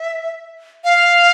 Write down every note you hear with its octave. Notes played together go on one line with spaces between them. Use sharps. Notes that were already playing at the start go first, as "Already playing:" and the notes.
Already playing: E5
F5